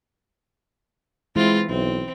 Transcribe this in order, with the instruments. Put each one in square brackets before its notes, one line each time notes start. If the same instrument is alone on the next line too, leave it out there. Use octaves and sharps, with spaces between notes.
[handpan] E3 E4 [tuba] G#3 [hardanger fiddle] C4 F4
[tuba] B1 [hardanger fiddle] C4